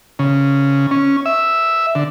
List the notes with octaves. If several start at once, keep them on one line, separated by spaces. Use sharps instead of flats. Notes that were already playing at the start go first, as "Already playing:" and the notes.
C#3
C#4
E5
D3